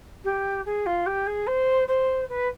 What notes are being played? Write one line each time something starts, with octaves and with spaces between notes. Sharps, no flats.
G4
G#4
F4
G4
G#4
C5
C5
B4